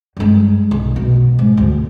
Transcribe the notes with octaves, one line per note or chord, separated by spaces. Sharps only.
G2 G#3
B1
B2
G#2
D2